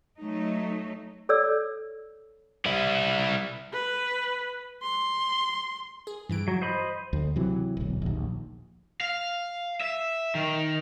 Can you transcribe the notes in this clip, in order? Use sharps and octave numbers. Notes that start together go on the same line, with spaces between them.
F#3 A3 D#4
A4 C#5 D5 E6
G3 E4
B4
C6
G#4
G2 E3 D7
F#3
C5 D#5 B5
D2
C3 E3 F#3
D1 B1
A#1 D#2
F5
E5
D#3